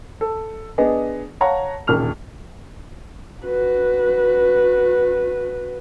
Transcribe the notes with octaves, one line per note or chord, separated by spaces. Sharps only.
A4
B3 D4 G#4 D#5
C#5 F5 F#5 A5 A#5
E1 D#2 A#2 C#3 F6 F7
F#4 B4